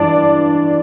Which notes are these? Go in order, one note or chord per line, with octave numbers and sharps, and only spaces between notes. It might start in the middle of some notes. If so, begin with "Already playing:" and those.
Already playing: G2 E3 D4 D5